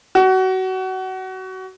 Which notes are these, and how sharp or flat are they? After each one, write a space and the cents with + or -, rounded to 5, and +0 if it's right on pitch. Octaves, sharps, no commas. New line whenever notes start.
F#4 +25